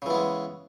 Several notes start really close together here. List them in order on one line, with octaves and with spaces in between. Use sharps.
C#3 E3 B3 G#3